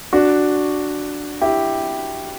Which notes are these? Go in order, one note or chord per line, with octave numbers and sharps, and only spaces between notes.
D4 F#4
E4 G4